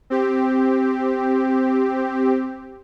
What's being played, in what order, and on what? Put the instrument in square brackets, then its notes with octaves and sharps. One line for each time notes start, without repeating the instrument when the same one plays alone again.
[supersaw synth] C4 G4